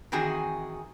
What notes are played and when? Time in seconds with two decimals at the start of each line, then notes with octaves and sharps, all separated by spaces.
0.12 D#3 E3 C4 F#4 G#4